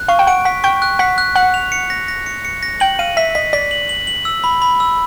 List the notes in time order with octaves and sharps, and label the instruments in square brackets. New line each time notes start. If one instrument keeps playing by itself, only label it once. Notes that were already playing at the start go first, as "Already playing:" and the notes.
Already playing: [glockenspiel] F#6
[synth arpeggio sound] F5 [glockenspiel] C#6
[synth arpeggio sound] G5
[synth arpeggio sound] F#5 [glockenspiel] D7
[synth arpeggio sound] F#5 [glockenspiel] B6
[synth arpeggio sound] G5 [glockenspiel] C#6
[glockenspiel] F#6
[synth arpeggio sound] F#5 [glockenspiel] B6
[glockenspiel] F#6
[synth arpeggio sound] F#5 [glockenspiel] F#6
[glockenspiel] F7
C#7
A#6
A#6
C#7
C#7
A#6
[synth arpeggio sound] G5 [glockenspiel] F#7
[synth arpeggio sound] F5 [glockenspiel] D#7
[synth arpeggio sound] E5 [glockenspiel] B6
[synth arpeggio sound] D#5 [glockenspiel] B6
[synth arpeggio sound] D5 [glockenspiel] B6
[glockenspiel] F#7
F#7
F#7
E6
B5
B5
E6